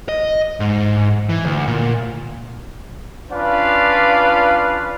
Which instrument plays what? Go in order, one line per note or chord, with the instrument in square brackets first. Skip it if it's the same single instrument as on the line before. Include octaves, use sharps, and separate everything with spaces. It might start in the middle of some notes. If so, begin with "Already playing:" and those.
[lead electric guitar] D#5
G#2
E3
D2
A#2
[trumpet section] C#4 D4 F4 B4 D5 F5